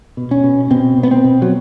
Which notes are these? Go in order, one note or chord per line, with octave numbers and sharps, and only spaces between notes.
B2
C#4
B2
B2 C4
B2
B3
C4
B2
F#3